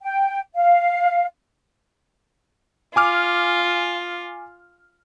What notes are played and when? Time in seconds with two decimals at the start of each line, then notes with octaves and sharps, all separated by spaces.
0.02 G5
0.54 F5
2.96 F4 G#5 D6 F6